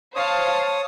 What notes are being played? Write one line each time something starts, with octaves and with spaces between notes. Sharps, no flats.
C5 C#5 F5 A5 D#6